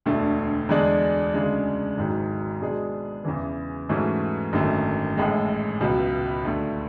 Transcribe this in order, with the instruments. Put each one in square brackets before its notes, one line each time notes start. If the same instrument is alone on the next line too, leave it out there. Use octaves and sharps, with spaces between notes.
[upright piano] E1 D2 D3 A3
E2 D3 G#3 D4
D2 C#3 G#3 D4
G#1 G#2 F#3
B2 G#3 D4 G#4
E2 C#3 E3
G#2 E3 A3 C#4 F#4
G#1 F#2 D3 A3
A1 A2 G#3
C#2 B2 F#3
D2 D3 A3